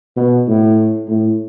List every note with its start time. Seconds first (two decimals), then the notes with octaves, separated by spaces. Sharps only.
0.16 B2
0.48 A2
1.08 A2